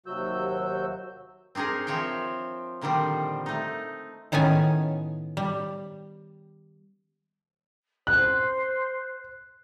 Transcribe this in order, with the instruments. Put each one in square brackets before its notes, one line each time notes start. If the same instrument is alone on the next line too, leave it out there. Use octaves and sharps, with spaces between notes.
[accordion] D#2 C3 F#3 F#4 E6 G6
[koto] C4 D4 D#4 G#4 A#4
F3 C4 C#5 E5 G5
A#2 D3 D#3 F3 G3 C4
A3 D#4
A2 D#3 B3 C#4 G#5
G3
[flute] C5 [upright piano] F#6